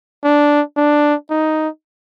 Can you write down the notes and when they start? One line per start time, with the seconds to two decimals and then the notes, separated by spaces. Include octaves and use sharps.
0.24 D4
0.77 D4
1.31 D#4